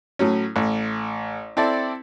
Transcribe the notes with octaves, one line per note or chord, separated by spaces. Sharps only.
A2 F#3 C#4
A1
C4 E4 A4 D5